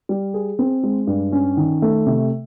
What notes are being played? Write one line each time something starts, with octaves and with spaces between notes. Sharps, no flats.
G3
G#4
C4
G#3
G2
C#4
D#3
A3
C3